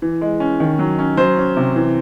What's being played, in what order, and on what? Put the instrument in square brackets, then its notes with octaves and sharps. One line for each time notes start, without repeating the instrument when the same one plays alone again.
[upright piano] E3
G#3
C#4
D#3
F#3
C#4
F#3 C5
C#4
C3
E3